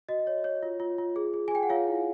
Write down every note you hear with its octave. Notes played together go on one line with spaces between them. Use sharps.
F#4 D#5
C#5
C#5
F4
F4
F4
G#4
G#4
G#5
G#4 G5
F#5
F4 C#5 F5
E4